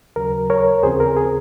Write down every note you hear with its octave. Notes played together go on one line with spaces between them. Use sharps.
D#2 C#3 F#3 A#4
A#4 C#5
D#2 C#3 F3 C4 G#4 C5
A#4
G#4